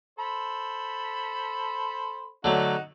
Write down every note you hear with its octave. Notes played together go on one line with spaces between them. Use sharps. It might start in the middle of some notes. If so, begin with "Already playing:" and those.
A4 C5 B5
D3 F#3 A3 D#4 F#4